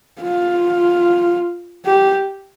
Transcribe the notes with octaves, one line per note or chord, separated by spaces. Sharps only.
F4
G4